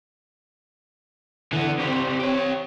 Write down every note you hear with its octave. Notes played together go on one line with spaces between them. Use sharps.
D3 E3 B3
C#2 G3 C4
G4 C#5